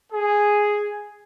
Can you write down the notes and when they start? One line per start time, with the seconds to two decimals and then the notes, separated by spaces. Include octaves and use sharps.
0.12 G#4